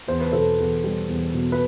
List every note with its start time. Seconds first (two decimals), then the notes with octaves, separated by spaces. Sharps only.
0.08 E2 C5
0.21 B4
0.32 B2 A4 C5
0.59 E2
0.84 G3
1.09 E2
1.34 B2
1.52 B4